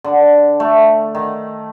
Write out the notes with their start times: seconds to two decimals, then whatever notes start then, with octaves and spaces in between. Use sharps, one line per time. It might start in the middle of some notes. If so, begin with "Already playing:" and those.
0.04 D3
0.60 A3
1.15 D#3